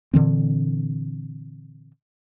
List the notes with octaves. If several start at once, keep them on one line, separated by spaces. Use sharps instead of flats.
A#2 D3 E3 C4